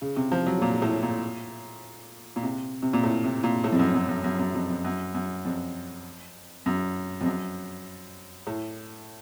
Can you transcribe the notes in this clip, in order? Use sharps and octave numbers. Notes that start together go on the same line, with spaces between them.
C#3
C3
F3
F#3
A#2
A2
A#2
A#2
C3
C3
A#2
A2
C3
A#2
A2
F2
F#2
F#2
F#2
F#2
F#2
F2
F2
F#2
F#2
F2
F#2
F2
F#2
A2